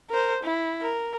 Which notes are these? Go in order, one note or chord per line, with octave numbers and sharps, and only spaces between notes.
A#4 C5
E4
A#4